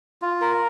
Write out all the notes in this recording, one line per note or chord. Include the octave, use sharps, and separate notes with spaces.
F4
A#4